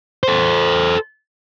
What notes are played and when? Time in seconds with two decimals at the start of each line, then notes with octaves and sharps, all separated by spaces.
0.23 A4 C5